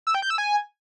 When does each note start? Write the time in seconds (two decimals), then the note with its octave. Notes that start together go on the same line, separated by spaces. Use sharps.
0.07 E6
0.15 G5
0.22 G6
0.30 E6
0.38 G#5